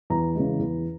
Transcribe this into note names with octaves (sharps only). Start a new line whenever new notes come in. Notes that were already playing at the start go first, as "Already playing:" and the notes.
E2 A#5
C#3 E3 G#3
E2